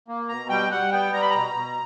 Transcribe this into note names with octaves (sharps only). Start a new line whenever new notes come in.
A#3
B2 A#5
G3 G5
G3 F#5
B3 G5
G3 A#5
B5
B2 A#5
B2